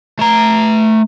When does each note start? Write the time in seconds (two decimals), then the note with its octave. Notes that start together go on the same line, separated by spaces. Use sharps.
0.19 A3 A#5